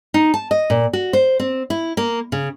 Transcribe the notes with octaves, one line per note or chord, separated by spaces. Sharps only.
D#4
A5
D#5
A#2
F#4
C5
C4
E4
A#3
C#3